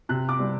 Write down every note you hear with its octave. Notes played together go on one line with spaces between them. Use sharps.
C3 F#6
D6
G3 C4